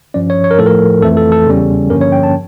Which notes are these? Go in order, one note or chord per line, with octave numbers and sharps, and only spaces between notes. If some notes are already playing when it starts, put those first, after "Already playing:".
G2 F3 C#4 D5
C#5
C#5
A#4
A2 F3 A3 A4
A#4
F2 E3 A3 A4
A4
A4
E2 C#3 G3 C#4
G2 D3 F3 A#3 C#4 A#4
C#5
G5
A5